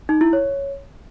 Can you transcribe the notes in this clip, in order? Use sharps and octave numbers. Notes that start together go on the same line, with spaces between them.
D#4
E4
C#5